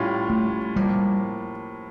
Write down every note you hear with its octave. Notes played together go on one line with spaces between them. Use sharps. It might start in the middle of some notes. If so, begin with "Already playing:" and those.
Already playing: A2 G3 C#4 F4
A3
A2 F3 G3 A#3